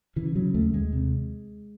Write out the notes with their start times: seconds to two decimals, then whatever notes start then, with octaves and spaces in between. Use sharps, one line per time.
0.16 C#3 E3
0.35 C#3 F#3
0.54 D#2 A3
0.73 D#2 G#3
0.92 C3